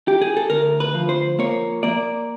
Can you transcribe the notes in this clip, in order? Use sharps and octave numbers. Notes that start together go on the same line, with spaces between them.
G4
G#4
A4
D2 A#4
B4
F3
C5
A#3 C#5
A#3 D5